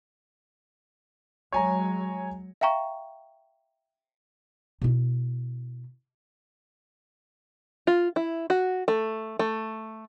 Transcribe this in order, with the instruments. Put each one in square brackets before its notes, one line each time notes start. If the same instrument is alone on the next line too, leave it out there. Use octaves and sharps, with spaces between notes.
[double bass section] F#3 G#3 [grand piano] C#5 G#5 A#5
[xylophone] E5 F5 G5 A#5 C#6
[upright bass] B2 E4
[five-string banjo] F4
E4
F#4
A3
A3